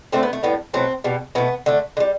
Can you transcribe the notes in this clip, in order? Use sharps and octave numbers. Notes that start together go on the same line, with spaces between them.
D3 A3 C4
B3
A3
A2 G3 B3
B2 F#3 A3 C4
B2 G3
B2 A3 B3
D3 A3
D3
G3